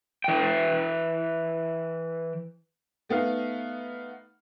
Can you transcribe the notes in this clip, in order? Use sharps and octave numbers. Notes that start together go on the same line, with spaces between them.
E3 G5
A3 B3 D#4 F5